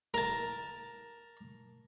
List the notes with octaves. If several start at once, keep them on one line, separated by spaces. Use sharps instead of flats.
A#4 A5